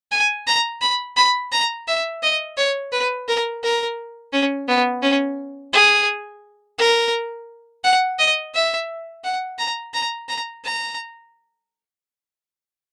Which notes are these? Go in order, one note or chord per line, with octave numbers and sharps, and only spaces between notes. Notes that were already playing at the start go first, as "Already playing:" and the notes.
G#5
A#5
B5
B5
A#5
E5
D#5
C#5
B4
A#4
A#4
C#4
B3
C#4
G#4
A#4
F#5
D#5
E5
F#5
A#5
A#5
A#5
A#5